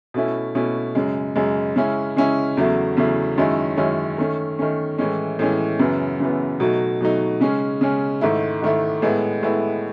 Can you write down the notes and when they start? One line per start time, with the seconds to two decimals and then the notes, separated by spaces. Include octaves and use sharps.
0.14 B2 A3 C#4 E4
0.55 B2 A3 C#4 E4
0.95 F#2 C#3 G#3
1.36 F#2 C#3 G#3
1.76 C#3 G#3 C#4 E4
2.16 C#3 G#3 C#4 E4
2.57 E2 C#3 F#3 A3 E4
2.97 E2 C#3 F#3 A3 E4
3.38 F#2 D#3 G#3 C#4 E4
3.77 F#2 D#3 G#3 C#4 E4
4.18 D#3 A3 C#4
4.59 D#3 A3 C#4
4.98 A2 E3 G#3 C#4
5.39 A2 E3 G#3 C#4
5.79 F#2 C#3 E3 B3
6.20 F#2 C#3 E3 B3
6.60 B2 F#3 A3 D#4
7.01 B2 F#3 A3 D#4
7.41 C#3 G#3 C#4
7.81 C#3 G#3 C#4
8.21 G#2 D#3 A3 E4
8.62 G#2 D#3 A3 E4
9.02 A2 G#3 B3 E4
9.43 A2 G#3 B3 E4